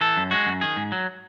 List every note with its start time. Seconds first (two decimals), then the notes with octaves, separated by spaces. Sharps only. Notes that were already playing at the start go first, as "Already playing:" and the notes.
0.01 E3 A4
0.17 F#2
0.31 G#3 F#4
0.46 F#2
0.61 D#3 G#4
0.76 G#2
0.92 F#3